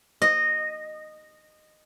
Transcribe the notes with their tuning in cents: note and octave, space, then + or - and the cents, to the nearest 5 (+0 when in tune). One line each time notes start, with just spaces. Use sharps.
D#5 -15